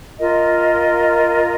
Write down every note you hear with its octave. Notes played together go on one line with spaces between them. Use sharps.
F4 A#4 D#5